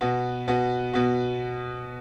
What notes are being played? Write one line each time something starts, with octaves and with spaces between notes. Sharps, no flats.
B2 B3 F#4
B2 B3 F#4
B2 B3 F#4